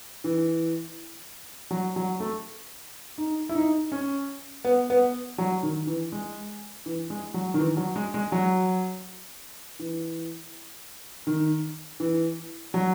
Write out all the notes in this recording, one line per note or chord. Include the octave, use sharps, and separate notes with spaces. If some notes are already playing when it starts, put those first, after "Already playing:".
E3
F#3
F#3
A3
D#4
E4
D#4
C#4
B3
B3
F#3
D#3
E3
G#3
E3
G#3
F#3
D#3
E3
F#3
G#3
G#3
F#3
E3
D#3
E3
F#3